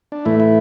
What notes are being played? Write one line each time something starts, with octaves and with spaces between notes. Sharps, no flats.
D4
A2 E3 A3 E4
E4